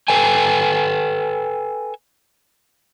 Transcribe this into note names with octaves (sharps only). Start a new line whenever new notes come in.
A4 B4 G5 G#5